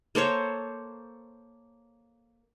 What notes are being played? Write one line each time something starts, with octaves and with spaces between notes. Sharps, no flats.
A#3 A4 C5 C#5